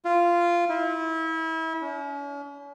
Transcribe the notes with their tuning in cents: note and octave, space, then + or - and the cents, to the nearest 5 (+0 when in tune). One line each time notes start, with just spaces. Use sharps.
F4 -10
E4 -30
C#4 +40